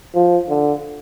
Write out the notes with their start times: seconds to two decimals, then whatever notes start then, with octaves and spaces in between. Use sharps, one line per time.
0.15 F3
0.49 D3